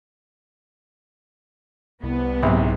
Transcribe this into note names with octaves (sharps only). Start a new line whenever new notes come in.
C2 B3
A#1 G#2 C3 F#3